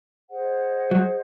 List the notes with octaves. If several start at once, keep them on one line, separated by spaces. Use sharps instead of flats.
G#4 C5 D#5 F#5
F#3